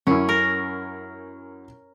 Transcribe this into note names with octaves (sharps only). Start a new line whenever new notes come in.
F#2 C#4 E4
A#4